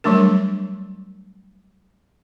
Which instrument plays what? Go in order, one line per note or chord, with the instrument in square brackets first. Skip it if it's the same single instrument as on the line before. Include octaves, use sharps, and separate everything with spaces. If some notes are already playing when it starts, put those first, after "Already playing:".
[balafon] F#3 G3 A3 D4 A#4